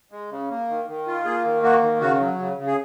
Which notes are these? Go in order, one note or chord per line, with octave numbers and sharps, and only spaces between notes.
G#3
C#3
A#3
D#3
D#3
F4
A#3 G#4
D#3
A#3 F#4
D#3
C#3 F#4
F#3
C#3
C#3
G#4